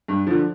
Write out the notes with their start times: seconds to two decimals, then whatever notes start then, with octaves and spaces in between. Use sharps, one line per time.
0.08 G2
0.27 D3 F3